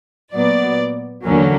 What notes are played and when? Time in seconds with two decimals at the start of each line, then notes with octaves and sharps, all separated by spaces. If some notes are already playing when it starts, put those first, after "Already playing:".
0.34 A#2 F#3 B3 D5
1.26 E2 D3 F#3 A#3 C#4